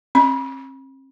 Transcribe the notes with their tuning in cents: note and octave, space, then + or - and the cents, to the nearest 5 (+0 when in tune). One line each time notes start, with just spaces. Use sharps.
C4 +45 B5 -35